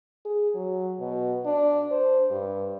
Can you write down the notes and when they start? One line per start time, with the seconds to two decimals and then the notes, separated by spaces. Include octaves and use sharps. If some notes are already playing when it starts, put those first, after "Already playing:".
0.25 G#4
0.55 F#3
0.99 B2
1.46 D4
1.91 C5
2.30 G2